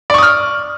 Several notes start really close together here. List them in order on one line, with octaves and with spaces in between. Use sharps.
D5 C#6 D#6 F6